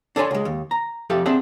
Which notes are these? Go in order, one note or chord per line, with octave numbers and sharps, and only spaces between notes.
D4 A4 C#5 G#5 C6
C#2 G#3
D#2
A#5
F2 F3 G4 A4 E5 F5
C4 D4 G#4 E5 F#5